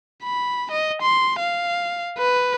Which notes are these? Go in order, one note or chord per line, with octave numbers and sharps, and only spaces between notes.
B5
D#5
C6
F5
B4